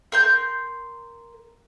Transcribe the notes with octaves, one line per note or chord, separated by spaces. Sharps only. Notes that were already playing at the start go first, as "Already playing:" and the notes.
A#4 C6 G6